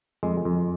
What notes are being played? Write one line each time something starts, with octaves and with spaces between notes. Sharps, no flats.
F2 G#3
F2